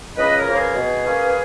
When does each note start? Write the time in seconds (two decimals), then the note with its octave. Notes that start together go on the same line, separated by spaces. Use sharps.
0.17 C#2 B4 D#5
0.37 A#4 C#5
0.47 C#3 F3 A#3
0.57 G#4 B4
0.76 B2
1.06 A#3 C#4